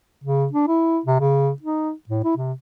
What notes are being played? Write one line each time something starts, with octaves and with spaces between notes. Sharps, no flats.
C#3
D4
E4
C3
C#3
D#4
A2
E4
C3